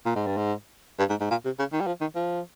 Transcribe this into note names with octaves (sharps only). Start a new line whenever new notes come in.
A#2
G#2
G2
G#2
G2
G#2
G#2
A#2
C3
C#3
D#3
G3
F3
D#3
F3